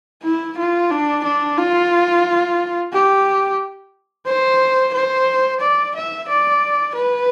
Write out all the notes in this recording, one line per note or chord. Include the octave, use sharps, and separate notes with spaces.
E4
F4
D4
D4
F4
G4
C5
C5
D5
E5
D5
B4